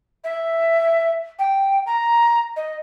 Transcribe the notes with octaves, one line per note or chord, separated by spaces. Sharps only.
E5
G5
A#5
D#5